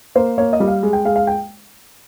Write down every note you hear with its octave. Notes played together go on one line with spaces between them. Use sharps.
A#3 C5
A#3 C#5
D#5
G3
F5
G#3
G5
G#3 F5
F5
G5